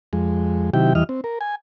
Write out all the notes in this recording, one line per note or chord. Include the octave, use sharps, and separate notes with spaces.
F2 G#3
C3 D#3 F#3 E4 G4 G5
E2 E3 G3 D#5 F6
C4
A#4
G#5